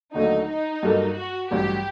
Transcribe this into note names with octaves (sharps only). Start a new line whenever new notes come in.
D#2 D3 F#3 A3 D#4
D#4
G2 F#3 A#3 F#4 A4
F#4
A1 G2 F#3 G4